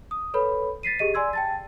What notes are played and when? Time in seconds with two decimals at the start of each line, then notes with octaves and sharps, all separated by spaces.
0.11 D#6
0.34 A4 B4 C#5 B5
0.83 A6 B6 C7 D#7
0.99 G4 G#4 D#5 D#7
1.14 D5 G#5 C6 E6 G#6
1.33 G5 A5 A6